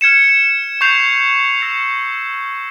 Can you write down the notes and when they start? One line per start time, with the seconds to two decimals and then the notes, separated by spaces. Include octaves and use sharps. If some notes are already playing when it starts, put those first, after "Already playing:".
0.01 F6 G#6 C#7 E7
0.81 C#6 G6 C7 F7
1.62 E6 A#6 C#7 F7